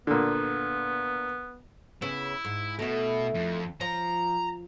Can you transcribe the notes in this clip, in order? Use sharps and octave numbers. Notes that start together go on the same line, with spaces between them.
A#2 D3 B3
C#3 B3 E4
G#2
B2 A3 E4
F2
F3 A#5